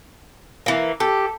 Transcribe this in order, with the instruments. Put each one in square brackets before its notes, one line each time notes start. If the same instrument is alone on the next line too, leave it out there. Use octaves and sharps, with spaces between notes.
[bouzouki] E3 A#3
[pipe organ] G4 [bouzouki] A4